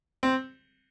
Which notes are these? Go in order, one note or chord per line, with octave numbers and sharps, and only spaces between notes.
C4